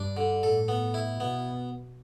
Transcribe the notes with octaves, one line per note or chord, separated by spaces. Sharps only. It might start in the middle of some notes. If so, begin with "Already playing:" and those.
Already playing: G2 D4
D3
A2 A4
B3
E4
B2 B3